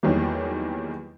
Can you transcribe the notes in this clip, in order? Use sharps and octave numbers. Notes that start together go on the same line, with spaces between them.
E2 D#3 F#3 G3 A#3